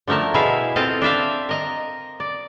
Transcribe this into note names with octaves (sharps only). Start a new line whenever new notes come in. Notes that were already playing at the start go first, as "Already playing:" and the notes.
D3 F3 A3 A#4 A5
B2 E4 G#4 E5 F5
C4 F4 A4 D#5 F5
D4 C5 E5 F5
A#4 D#5 A#5
D5